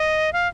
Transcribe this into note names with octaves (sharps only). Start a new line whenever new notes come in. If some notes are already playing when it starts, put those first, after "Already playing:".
Already playing: D#5
F5